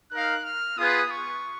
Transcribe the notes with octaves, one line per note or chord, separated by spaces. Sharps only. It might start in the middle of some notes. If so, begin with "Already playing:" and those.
D#4 A#4 F5 F#6
F6
B3 F4 G#4 B4 D#6
C#6